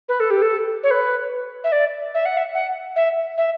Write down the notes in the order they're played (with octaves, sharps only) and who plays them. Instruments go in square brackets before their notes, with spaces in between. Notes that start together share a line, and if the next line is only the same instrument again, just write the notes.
[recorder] B4
A4
G4
A4
C#5
B4
E5
D5
E5
F#5
E5
F#5
E5
E5